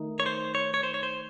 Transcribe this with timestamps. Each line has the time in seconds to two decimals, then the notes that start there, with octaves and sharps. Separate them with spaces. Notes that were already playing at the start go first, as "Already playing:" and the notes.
Already playing: D#3 A3 D#4
0.20 C#5
0.26 C5
0.55 C#5
0.74 C#5
0.83 C5
0.94 C#5
1.03 C5